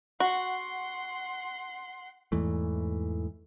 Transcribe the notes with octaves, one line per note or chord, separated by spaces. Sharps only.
F#4 F#5 C6
E2 G#2 E3 A3